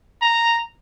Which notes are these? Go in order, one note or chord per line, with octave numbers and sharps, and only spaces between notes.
A#5